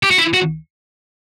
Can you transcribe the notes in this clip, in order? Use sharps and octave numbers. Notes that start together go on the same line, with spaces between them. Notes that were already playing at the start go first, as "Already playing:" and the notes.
G4
F#4
E4
F#4